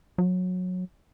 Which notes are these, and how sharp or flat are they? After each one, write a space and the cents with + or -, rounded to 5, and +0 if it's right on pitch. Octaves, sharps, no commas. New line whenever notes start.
F#3 -20